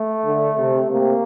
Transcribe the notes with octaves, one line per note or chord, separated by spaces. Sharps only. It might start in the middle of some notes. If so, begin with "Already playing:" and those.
Already playing: A3
D3
C3
C3 A#3